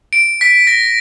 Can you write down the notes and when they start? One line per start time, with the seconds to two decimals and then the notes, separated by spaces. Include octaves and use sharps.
0.13 D7
0.41 B6
0.67 A#6